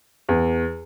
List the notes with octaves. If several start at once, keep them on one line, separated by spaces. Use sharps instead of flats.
E2